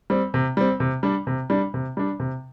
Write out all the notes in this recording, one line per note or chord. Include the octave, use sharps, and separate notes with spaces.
G3 C4
C3
G3 C4
C3
G3 D4
C3
G3 D4
C3
G3 D4
C3